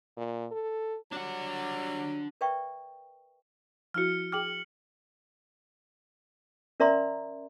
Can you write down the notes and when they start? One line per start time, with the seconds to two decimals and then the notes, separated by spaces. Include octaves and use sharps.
0.17 A#2
0.51 A4
1.12 F#3 G3 D4 F#5
2.41 A#4 B4 D5 E5 G5 C#6
3.94 F3 E4 F#4 F6 C#7
4.32 G#4 G5 D6 F6 F#7
6.80 C#4 A#4 D5 E5 A#5 C6